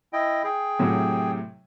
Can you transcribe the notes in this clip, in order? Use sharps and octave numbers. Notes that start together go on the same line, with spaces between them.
E4 D#5 G5
G#4 G5
A2 C3 F#3